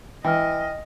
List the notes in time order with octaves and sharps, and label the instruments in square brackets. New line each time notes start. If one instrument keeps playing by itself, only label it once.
[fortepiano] E3 [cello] D#5 [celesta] G5 F6